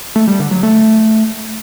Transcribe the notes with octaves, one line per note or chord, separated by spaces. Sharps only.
A3
G3
D3
F#3
A3